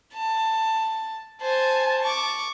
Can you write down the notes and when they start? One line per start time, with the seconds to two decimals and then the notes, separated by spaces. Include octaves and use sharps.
0.14 A5
1.42 C5 G#5 A5
2.02 C#6 D6